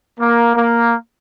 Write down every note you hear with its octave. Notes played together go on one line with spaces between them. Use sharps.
A#3
A#3